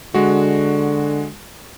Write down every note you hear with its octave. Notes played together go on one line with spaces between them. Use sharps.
D3 G#3 F#4